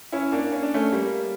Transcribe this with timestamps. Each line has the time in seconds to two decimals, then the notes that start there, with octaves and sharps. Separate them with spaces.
0.12 C#4 E4
0.32 A#3 D4
0.52 C#4
0.63 D4
0.74 A3 C#4
0.92 G3 A#3